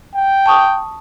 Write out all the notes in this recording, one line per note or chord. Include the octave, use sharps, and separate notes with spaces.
G5
A5 C#6 D#6